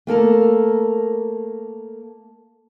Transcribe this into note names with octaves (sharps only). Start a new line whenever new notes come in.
A3 A#3 A4 A#4